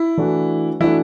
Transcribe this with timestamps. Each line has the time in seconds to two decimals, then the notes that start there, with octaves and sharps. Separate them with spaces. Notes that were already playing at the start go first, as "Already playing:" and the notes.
Already playing: E4
0.18 E3 A3 D4 F#4
0.80 E3 A3 D4 E4 F#4